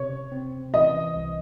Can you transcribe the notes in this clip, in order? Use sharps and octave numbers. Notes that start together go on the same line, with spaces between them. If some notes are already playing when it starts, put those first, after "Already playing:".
Already playing: C3 C#5
C4
E3 D#5
C2